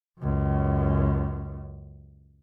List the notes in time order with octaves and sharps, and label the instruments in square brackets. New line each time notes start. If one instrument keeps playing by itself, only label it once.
[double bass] C#2 F#2